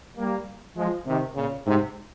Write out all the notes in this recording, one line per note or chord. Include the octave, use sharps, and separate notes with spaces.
G3 A#3
F3 G#3
C3 D#3
A#2 C#3
G#2 C3